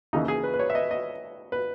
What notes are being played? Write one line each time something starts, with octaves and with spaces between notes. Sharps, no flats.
D#2 C#3 E3 D#4
G#4
B4
B4
C#5
E5
D#5
D#5
B4